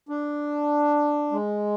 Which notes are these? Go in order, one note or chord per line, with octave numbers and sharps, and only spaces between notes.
D4
G#3